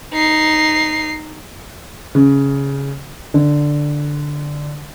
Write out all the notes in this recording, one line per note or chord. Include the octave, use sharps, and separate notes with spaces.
D#4 C7
C#3
D3